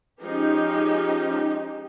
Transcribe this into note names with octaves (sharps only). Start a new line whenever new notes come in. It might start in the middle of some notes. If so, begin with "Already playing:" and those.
F3 G#3 C#4 D#4 G4